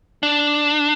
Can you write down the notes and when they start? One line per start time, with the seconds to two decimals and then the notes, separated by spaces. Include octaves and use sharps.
0.23 D4